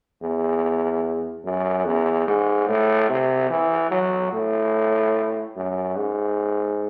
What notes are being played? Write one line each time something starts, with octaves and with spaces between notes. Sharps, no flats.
E2
F#2
E2
G#2
A2
C3
E3
F#3
A2
F#2
G#2